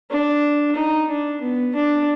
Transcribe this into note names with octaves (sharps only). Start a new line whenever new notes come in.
D4
D#4
D4
B3
D4